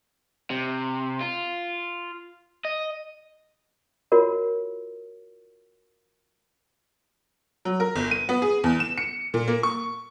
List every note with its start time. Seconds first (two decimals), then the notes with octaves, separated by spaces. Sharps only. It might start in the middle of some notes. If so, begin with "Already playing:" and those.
0.50 C3
1.21 F4
2.65 D#5
4.12 F4 F#4 A#4 C#5
7.65 F#3
7.80 A#4
7.96 G1
8.11 D#7
8.29 B3
8.42 G#4
8.64 E2
8.80 E7
8.98 C#7
9.34 A#2
9.48 A#3
9.63 C#6